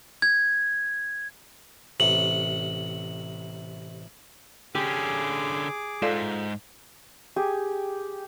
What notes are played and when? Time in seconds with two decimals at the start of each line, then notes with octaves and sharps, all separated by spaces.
0.22 G#6
2.00 A1 C3 F#7
4.75 D3 C#4 G4 G#4 D6
6.02 G#2 F4 A4 D5
7.36 G4 G#4